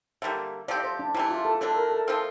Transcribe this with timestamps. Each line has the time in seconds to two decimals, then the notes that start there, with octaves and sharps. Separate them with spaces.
0.22 D3 G3 A#3 E5
0.68 F3 A3 C4 G4 D5
0.84 C5
0.99 D4
1.14 C3 E3 A3 E4
1.31 F4
1.45 A4
1.61 D3 A3 D4 A4
1.76 A#4
1.92 A4
2.08 F3 A3 C4 F4